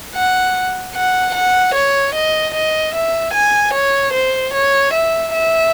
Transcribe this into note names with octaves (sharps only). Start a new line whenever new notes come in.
F#5
F#5
F#5
C#5
D#5
D#5
E5
G#5
C#5
C5
C#5
E5
E5